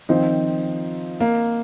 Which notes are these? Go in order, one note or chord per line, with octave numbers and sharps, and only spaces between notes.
D#3 F3 C4 D#4
A#3